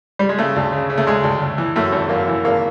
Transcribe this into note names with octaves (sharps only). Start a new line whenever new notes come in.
G3
G#3
C#3 A3
D2
C#3
C#3
A3
D2 G#3
D2
D2
E3
F#2 A3
G#1
F#2 A#3
E3
G#1 A#3